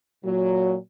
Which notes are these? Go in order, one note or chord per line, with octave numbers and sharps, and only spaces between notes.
A#2 F#3